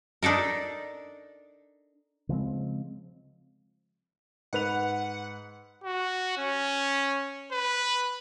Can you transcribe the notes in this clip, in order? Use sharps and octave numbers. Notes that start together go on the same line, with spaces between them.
D4 D#4 A4 A#4
C#3 F3 G#3 C4
G#2 B4 F#5 F7
F#4
C#4
B4